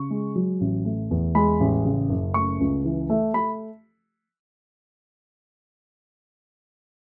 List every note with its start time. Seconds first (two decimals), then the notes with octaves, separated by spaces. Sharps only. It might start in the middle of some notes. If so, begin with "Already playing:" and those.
Already playing: C#3 C#6
0.10 G#3
0.35 F#3
0.61 A1
0.85 A3
1.11 E2
1.35 G#3 B5
1.60 A1
1.85 C#3
2.09 F#1
2.34 A3 C#6
2.60 C#2
2.85 E3
3.10 A3
3.34 A3 B5